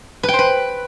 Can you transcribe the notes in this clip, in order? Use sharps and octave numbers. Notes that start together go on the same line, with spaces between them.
B4
G5
C5
B4